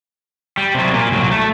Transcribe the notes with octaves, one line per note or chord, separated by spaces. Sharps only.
G3
C3 F#3
A#2
C2 F#3
A3